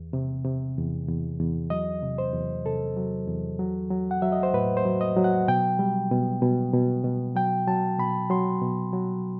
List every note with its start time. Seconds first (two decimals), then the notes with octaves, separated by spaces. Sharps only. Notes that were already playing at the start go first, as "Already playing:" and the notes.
Already playing: E2
0.13 C3
0.45 C3
0.77 E2
1.09 E2
1.40 E2
1.70 F#3 D#5
2.02 C3
2.18 C5
2.33 E2
2.66 C3 A4
2.96 F#3
3.28 E2
3.59 F#3
3.90 F#3
4.11 F#5
4.22 F#3 E5
4.32 D#5
4.43 C5
4.54 A2 B4
4.77 C5
4.85 F#3
5.01 D#5
5.17 F#3
5.24 F#5
5.48 B2 G5
5.79 G3
6.11 B2
6.42 B2
6.74 B2
7.04 B2
7.36 F#3 G5
7.67 F#3 A5
7.99 B2 B5
8.30 F#3 C6
8.61 B2
8.93 F#3